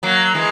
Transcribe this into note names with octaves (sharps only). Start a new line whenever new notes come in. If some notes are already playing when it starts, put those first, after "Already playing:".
F#3 A#3
E3 G#3